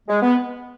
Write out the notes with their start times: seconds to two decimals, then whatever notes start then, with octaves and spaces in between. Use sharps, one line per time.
0.08 G#3
0.21 B3